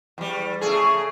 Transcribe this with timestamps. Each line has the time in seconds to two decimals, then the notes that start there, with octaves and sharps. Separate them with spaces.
0.18 E2 G3
0.61 C#3 A3 G#4